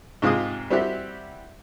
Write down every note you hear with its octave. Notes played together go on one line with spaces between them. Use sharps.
G#2 C3 F4 G#4 D#6
G3 C4 E4 F#4 G4 E5